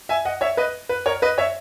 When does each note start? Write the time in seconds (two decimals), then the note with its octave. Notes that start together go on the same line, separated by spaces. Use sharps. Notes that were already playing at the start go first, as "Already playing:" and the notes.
0.09 E5 G#5
0.25 D#5 F#5
0.41 C#5 E5
0.57 B4 D#5
0.89 B4
1.06 A#4 C#5
1.22 B4 D#5
1.38 C#5 E5